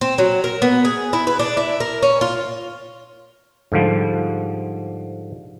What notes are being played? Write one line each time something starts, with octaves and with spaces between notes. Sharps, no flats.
C4
F#3
A#4
B3
G#4
E4
B4
D4
E4
A#4
C#4
F4
G#2 D3 F3 G3